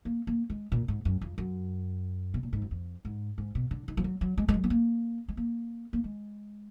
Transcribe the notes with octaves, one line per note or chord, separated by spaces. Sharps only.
A#3
A#3
G#3
A#2
G#2
F#2
F2
F#2
B2
A#2
G#2
F#2
F2
G#2
G#2
B2
D3
D#3
F3
F#3
F#3
G#3
G#3
F#3
B3
A#3
G#3
A#3
A#3
G#3